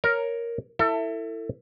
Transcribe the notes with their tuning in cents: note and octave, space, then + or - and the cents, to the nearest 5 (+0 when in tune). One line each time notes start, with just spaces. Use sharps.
A#4 +5 C#5 +0
E4 +5 A4 +30